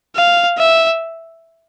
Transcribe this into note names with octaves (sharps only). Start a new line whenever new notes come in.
F5
E5